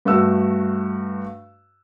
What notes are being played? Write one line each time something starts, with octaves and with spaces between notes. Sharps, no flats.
G2 A3 F#4 E6